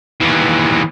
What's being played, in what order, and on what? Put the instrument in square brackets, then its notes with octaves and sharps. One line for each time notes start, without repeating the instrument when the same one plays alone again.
[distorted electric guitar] D#2 E3